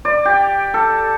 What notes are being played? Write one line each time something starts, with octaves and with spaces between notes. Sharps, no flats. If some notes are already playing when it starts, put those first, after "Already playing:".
D5
G4
A4